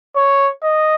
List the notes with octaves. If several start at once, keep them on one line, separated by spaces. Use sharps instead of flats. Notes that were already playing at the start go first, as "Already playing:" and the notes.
C#5
D#5